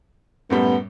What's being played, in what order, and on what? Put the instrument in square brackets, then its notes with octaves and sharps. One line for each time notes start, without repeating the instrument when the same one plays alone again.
[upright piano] F#2 A2 G3 [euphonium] B3